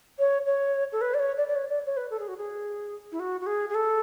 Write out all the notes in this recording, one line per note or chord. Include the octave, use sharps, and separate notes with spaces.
C#5
C#5
A4
B4
D5
C#5
D5
D5
C#5
D5
C#5
B4
A4
G#4
F#4
G#4
E4
F#4
F#4
G#4
G#4
A4